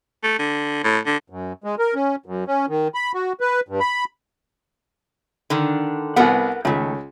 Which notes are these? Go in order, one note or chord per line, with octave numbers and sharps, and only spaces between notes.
A3
D3
A2
D3
F#2
G#3
A#4
C#4
F#2
C#4
D#3
B5
F#4
B4
G2
B5
D3 D#3 D4
C2 B3 A#4 B4 F#5
C#2 D#3 A3